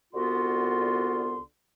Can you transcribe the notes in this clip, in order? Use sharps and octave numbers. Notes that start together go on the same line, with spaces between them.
C2 D3 B3 F4 F#4 C6